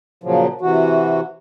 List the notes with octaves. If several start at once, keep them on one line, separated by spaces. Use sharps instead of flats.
A#2 C#3 F3 F#3
C3 E3 F#4